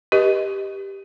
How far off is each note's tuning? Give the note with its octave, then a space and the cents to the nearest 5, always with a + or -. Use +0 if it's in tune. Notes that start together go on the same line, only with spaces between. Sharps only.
G4 +0 B4 -35 D#5 +0